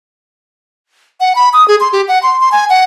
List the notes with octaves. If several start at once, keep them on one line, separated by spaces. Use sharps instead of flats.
F#5
B5
D#6
G#4
C6
G4
F#5
C6
C6
G#5
F#5